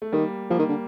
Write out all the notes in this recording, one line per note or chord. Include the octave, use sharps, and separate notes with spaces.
A3
D#3 G3 A#3
F3 G3 A#3
D#3
D3